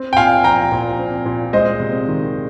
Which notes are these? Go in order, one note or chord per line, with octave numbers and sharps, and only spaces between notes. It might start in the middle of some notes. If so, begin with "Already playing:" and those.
Already playing: C4
G5
A#2 F5 G#5
F3 G5 A#5
A#2
C4
A#2
G#3 C5 D#5
C3
D#3